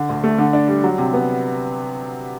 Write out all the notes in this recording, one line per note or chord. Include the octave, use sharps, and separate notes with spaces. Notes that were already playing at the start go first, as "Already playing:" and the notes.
Already playing: D3
D2
A3
D3
D4
G3
F#3
C3
B3